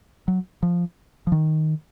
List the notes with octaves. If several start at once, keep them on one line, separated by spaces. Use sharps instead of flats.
F#3
F3
F3
D#3